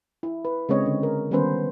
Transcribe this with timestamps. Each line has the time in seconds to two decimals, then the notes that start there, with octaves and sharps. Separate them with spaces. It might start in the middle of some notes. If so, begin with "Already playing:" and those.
0.23 E4
0.45 B4
0.69 C#3 G#3 C4 C#5 D#5
0.86 D3
1.03 A#4
1.31 D#3 G3 B3 C#4 B4 C5